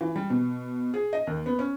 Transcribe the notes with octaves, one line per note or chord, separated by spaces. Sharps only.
E3
G3
B2
G#4
D#5
D#2
B3
C#4